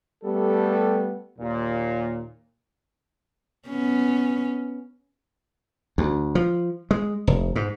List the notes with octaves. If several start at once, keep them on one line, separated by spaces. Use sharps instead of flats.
G3 A3 B3 G4 A4
D#2 A#2
B3 C#4
D2
F3
G#3
F1
G#2